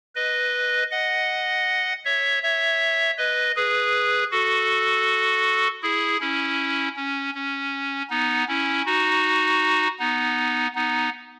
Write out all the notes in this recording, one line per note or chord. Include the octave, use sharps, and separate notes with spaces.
B4 D#5
D#5 F#5
C#5 E5
C#5 E5
B4 D#5
G#4 B4
F#4 A4
E4 G#4
C#4 E4
C#4
C#4
B3 D#4
C#4 E4
D#4 F#4
B3 D#4
B3 D#4